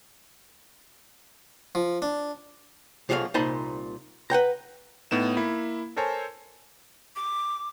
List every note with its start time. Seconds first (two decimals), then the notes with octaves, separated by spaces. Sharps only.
1.75 F3
2.02 D4
3.09 B1 F3 F#3 G#3 A3 F5
3.34 C2 A#2 D#4 C5 A5 B5
4.30 B4 F#5 G5 A#5
5.11 A2 B3 D#4 E7
5.37 A#3 E4 B5
5.96 A4 A#4 C5 C#5 G#5 A5
7.16 D6